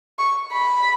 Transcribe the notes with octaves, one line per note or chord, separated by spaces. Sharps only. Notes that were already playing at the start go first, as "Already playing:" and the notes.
C#6
B5